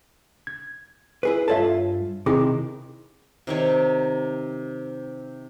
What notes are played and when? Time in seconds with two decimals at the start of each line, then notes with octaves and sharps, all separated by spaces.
0.47 G#6
1.23 E4 G#4 B4
1.48 G2 F4 A4 C#5 E5 A5
2.26 C3 D#3 E4 G#4 D6
3.47 C3 D#3 C#5